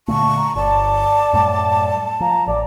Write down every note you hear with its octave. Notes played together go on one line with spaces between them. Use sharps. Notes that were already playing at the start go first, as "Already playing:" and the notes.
A#2 D3 A3 A5 C#6
A#5
G1 D5 A5
F#2 A2 G3
F3 A#5
A1 D5